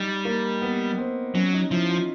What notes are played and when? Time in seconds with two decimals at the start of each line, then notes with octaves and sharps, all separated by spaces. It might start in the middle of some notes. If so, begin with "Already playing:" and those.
Already playing: G3 D#4
0.25 A#3
0.62 B3
0.98 C4
1.34 F#3 C#4
1.53 D#4
1.71 F3 E4
1.90 F4